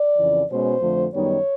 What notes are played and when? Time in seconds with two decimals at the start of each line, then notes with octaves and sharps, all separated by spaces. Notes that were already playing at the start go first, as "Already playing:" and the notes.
Already playing: D5
0.18 F2 C#3 E3
0.50 B2 G#3 C#4 C5
0.81 F2 D3 F3 A3
1.13 F#2 D#3 G3 B3 D#4 C#5